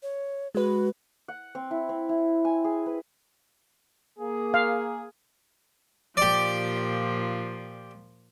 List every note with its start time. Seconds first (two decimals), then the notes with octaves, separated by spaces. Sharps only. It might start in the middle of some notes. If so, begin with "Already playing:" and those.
0.03 C#5
0.55 G#3 F#4 B4
1.28 F#5
1.55 C4
1.71 E4
1.89 C4
2.09 E4
2.45 G#5
2.64 G#4
2.86 B4
4.19 A#3 G#4
4.54 F5
6.17 A#2 F3 G4 D5